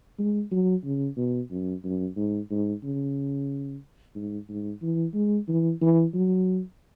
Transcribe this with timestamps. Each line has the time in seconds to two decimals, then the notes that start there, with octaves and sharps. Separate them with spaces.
0.19 G#3
0.52 F#3
0.84 C#3
1.18 B2
1.51 F#2
1.84 F#2
2.16 G#2
2.50 G#2
2.84 C#3
4.15 G#2
4.49 G#2
4.82 E3
5.14 G#3
5.48 E3
5.81 E3
6.14 F#3